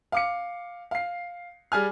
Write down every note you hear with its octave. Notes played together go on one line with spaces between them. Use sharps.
F5 D6 C#7
F5 C7
G3 G#4 G#5 F6